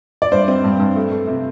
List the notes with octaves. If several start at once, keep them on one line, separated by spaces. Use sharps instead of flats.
D5
G2 C5
C4
G2
G2
A3
A3
C3